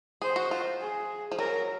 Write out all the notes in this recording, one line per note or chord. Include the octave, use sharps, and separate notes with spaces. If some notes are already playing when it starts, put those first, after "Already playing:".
G#4 C5
F#4
F4
G#4
F3
F#3 A#4